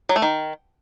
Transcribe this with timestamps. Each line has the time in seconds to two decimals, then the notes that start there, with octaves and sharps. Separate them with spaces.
0.09 F#3
0.16 A3
0.22 D#3